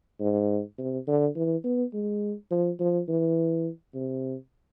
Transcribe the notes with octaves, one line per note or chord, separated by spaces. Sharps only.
G#2
C3
D3
E3
B3
G#3
F3
F3
E3
C3